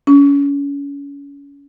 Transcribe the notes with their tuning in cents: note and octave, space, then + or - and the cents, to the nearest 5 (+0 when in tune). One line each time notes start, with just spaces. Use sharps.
C#4 +30